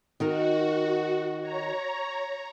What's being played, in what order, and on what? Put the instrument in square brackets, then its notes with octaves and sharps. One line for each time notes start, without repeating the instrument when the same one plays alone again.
[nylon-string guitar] D#3 D#4 A#4 [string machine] F#4
[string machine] C#5 A#5